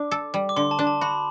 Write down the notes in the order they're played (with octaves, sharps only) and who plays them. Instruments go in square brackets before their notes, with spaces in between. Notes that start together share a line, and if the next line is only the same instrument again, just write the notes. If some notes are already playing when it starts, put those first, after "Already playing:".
Already playing: [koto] D4 [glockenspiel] D6
[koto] A4
G3
[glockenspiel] D6
[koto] D3 [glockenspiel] C6
[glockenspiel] A5
[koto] D4
[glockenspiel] A5
[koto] F#4 [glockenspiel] B5